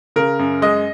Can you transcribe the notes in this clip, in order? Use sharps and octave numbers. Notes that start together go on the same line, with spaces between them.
C#3 A#4
F#2
G#3 D#5